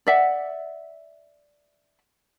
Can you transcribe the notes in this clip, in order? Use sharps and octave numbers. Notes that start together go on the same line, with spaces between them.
D5 E5 F#5